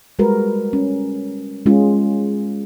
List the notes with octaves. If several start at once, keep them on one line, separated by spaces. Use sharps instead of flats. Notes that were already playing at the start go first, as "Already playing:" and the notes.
G3 G#3 F#4 A#4 B4
C#4
G#3 C#4 F4 G#4